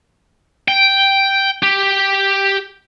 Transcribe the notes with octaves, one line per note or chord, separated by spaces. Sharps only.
G5
G4